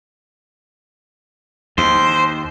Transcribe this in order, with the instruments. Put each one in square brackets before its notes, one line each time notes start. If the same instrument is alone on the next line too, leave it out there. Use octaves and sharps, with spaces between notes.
[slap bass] D#2 [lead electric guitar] C5